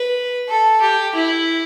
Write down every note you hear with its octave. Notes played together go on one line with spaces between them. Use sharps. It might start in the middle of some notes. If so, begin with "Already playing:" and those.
Already playing: B4
A4
G4
E4